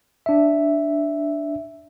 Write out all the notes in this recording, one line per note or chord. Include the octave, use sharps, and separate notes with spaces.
D4 E5